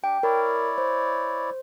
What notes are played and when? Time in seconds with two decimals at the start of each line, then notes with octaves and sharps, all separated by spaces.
0.04 D4 G4 G5
0.23 E4 A#4 C#5 D5
0.78 C5